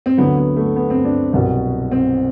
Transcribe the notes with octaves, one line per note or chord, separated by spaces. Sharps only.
C4
D2 D3 F#3 B3
B3
A3
B3
C4
D4
C2 B2 F#3
C4